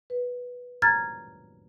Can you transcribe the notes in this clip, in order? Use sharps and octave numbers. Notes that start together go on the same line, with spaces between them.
B4
A#5 F6 G#6 A6